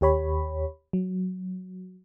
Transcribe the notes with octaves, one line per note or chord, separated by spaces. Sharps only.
D#2 G4 C#5 B5
F#3